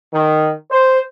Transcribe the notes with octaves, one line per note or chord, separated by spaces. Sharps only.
D#3
C5